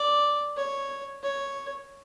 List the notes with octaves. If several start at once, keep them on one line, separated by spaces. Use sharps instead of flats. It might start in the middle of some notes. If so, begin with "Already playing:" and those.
Already playing: D5
C#5
C#5